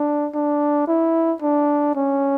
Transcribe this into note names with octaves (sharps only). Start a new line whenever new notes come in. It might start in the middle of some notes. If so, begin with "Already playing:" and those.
Already playing: D4
D4
E4
D4
C#4